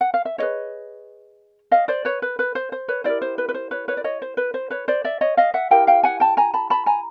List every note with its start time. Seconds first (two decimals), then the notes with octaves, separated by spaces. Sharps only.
0.01 F#5
0.14 F5
0.25 E5
0.38 E4 G#4 B4 C#5 D#5
1.71 D#5 F5
1.88 C5 D5
2.05 B4 C#5
2.22 B4
2.39 B4
2.55 C5
2.72 C5
2.88 B4 C#5
3.04 E4 G4 A#4 C5 D5
3.22 C5
3.38 B4
3.49 B4
3.54 C5
3.71 B4 C#5
3.88 B4 C#5
3.97 D5
4.04 C#5 D#5
4.22 C5
4.37 B4
4.54 C5
4.70 B4 C#5
4.88 C5 D5
5.04 D5 E5
5.21 C#5 D#5
5.37 D#5 F5
5.54 E5 F#5
5.71 E4 G4 A#4 F5 G5
5.87 F5 G5
6.03 F#5 G#5
6.20 G5 A5
6.37 G#5 A#5
6.54 A5 B5
6.70 A5 B5
6.86 G#5 A#5